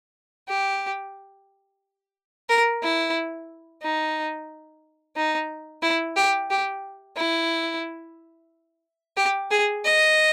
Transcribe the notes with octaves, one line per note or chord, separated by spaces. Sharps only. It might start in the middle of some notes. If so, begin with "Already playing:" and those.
G4
A#4
E4
D#4
D#4
E4
G4
G4
E4
G4
G#4
D#5